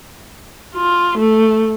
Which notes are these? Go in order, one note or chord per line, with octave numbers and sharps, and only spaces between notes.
F4
A3